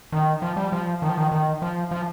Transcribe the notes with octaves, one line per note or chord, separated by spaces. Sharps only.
D#3
F3
G3
F3
D#3
F3
D#3
D#3
F3
F3